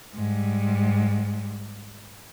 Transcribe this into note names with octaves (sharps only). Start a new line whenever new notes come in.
G#2 G3